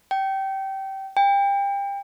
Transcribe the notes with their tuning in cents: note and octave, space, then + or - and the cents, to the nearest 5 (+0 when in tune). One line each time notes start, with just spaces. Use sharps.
G5 -20
G5 +30